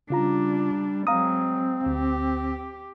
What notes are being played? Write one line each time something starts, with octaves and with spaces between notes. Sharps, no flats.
C#3 G3 D4 F4 A#5
F#3 G#3 C4 F5 A#5 D#6
D2 G4